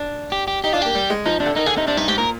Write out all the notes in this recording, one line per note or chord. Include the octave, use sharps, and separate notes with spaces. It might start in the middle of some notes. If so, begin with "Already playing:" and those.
Already playing: D4
G4
G4
D#4 G4
D4 F4
A#3 G4
G3
G#3
F3 D#4
C3 D4
D3
D#3 D#4
D3 G#4
C3 D#4
C3 D4
G2 D#4
G#2 G4
A#2 A#4